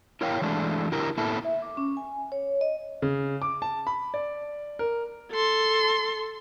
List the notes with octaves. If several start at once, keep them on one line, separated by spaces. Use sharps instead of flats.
E4 A#4 C#5 F5 G5
E3 G#3 A3 D4
D3 E4 G4 A#4
A#3 B3 E4 A4
E5
D6
C#4
G#5
C#5
D#5
C#3
D6
A5
B5
D5
A#4
A4 C6